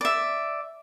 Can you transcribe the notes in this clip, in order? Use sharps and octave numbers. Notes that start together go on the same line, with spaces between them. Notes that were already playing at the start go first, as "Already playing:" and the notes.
D5 E5